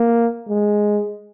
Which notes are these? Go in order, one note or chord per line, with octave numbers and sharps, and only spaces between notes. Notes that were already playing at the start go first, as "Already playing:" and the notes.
Already playing: A#3
G#3